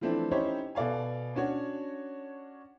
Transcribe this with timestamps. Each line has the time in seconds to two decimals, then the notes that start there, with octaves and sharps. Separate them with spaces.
0.01 E3 F3 A3 C4 D4 E4
0.31 C#4 D#4 E4 G4 C5 C#5
0.75 B2 A4 D5 F5 G#5
1.35 C#4 D4 F#4 C#5